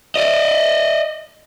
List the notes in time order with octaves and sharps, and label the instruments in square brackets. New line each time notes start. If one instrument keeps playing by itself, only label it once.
[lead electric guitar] D5 D#5